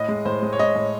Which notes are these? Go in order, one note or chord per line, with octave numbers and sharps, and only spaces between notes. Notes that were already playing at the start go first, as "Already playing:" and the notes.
Already playing: A2 D#5
G#3
A2 C5
G#3
C#5
G#3 D#5
A2